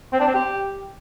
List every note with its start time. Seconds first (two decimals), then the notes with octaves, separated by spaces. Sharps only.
0.13 C4
0.20 D4
0.27 C4
0.34 G4